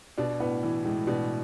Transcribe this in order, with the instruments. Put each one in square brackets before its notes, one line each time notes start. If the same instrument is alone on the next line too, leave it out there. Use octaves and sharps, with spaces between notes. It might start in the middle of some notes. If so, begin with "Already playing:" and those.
[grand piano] B2 [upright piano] D4
[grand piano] A2 [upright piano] B3
[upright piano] E3
[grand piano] A2 [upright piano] G#3
[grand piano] B2 [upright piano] D4